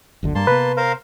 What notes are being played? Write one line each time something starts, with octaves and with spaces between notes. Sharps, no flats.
F#1 D2 D3
G2 G3 A#3 A5 C6
C3 B3 B4
A#4 C5 F5